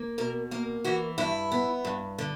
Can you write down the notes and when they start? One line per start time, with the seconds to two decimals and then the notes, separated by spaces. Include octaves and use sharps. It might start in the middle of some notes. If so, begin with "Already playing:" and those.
Already playing: A#3
0.18 B2 A#4
0.51 A#3 A#4
0.84 E3 F#4
1.18 G2 E4
1.52 B3
1.85 G2
2.18 D3